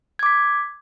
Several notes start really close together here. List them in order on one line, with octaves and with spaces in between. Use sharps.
G#6 D6 B6